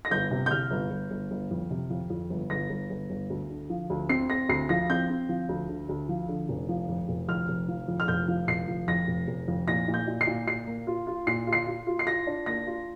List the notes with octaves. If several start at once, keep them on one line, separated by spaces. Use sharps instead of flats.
A#6
G1 G6
C3
G6
C3 F6
G1
G1
G1
G1
F2
C3
F2
F2
G1
G1 A#6
G1
G1
G1
D2
D3
F3
D2
C4 C7
C4 A#6
D2 C7
F3 A#6
C4 G6
C4
F3
D2
D3
D2
F3
D3
F1
F3
F2
F1
F2 F6
F1
F3
F2
F6
F1 G6
F3
F1 C7
F3
F2 A#6
F1
F1
F2
A#2 A#6
A#2
G6
A#2
C7
A#2
A#2 C7
A#3
F4
F4
A#2 C7
F4
C7
F4
F4
C7
F4 A#6
D4
A#3 A#6
F4